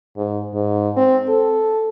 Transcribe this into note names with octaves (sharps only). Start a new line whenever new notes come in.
G#2
G#2
C4
A4